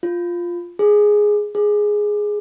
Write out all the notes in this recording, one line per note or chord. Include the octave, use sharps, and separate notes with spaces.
F4
G#4
G#4